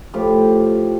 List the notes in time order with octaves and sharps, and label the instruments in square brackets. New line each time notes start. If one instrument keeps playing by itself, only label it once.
[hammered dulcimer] A2 F3 G4